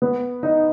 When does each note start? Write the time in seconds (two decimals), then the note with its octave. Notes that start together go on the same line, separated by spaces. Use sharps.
0.02 B3
0.43 D#4